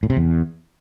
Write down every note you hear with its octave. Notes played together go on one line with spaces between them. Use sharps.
A2
C3
E2